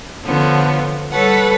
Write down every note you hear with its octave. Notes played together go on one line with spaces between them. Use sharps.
D3 F3 B3 C#5
G3 A4 B4 C#5 F#5